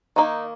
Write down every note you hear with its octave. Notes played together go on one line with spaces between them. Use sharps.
D#3 A#3 D#4